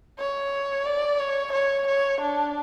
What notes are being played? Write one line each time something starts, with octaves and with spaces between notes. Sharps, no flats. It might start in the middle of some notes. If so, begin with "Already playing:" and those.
C#5
D5
C#5
C#5
C#5
D4